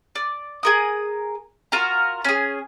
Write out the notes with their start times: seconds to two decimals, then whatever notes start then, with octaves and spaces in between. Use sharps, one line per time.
0.16 D5
0.63 G#4 A#4 D#6
1.72 F4 F#4 A#4 A#5
2.25 C#4 G#4